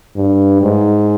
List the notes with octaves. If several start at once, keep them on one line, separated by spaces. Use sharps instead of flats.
G2
G#2